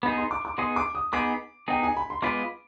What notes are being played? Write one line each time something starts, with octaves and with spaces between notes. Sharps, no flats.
B3 D#4 G#4 B5
C6
D6
D6
B3 D#4 G#4 C6
D6
D#6
B3 D#4 G#4 D6
B3 D#4 G#4 G5
G#5
B5
C6
G#3 B3 F4 B4 D6